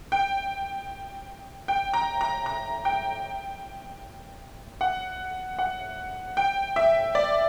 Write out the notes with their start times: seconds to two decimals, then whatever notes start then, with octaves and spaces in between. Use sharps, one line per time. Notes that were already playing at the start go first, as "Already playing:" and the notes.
0.12 G5
1.68 G5
1.94 A#5
2.21 A#5
2.46 A#5
2.85 G5
4.81 F#5
5.59 F#5
6.37 G5
6.76 E5
7.15 D5